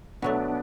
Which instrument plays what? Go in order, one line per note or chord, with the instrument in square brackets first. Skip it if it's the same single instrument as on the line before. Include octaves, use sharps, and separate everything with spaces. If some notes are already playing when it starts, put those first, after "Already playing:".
[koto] B2 F#3 A3 [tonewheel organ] B3 D4